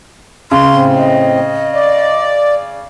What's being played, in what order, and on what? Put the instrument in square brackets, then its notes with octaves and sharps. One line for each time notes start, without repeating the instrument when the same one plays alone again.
[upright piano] C#3 [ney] C6
[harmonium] A2 C4
[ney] D#5
[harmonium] D5